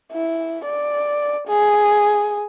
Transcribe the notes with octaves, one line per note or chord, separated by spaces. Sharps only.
E4
D5
G#4